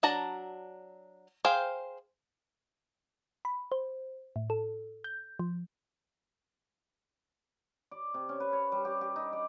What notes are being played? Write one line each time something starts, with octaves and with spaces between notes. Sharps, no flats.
F#3 D4 F#4 A5 A#5
G#4 C5 F5 G5
B5
C5
A2
A4
G6
F3
D5
C3
C#4
B4
C#5
G3
G4
G4
D#4
D5